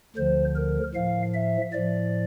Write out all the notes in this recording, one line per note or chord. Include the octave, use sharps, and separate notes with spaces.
D2 D3 F3 C5
A#4
A2 F3 F5
E5
A2 F3 D5